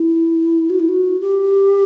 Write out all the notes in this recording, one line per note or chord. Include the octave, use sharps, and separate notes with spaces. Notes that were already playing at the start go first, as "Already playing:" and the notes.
Already playing: E4
F#4
E4
F#4
G4